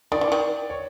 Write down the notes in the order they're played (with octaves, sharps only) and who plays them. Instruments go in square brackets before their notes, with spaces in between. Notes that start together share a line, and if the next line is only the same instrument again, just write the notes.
[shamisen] D#3 [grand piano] D5
[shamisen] E3
D#3
[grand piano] C#5